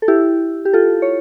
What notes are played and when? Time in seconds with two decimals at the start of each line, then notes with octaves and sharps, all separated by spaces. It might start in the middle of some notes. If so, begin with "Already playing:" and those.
0.02 A4
0.08 E4 G4
0.65 G4
0.73 F4 A4
1.02 C#5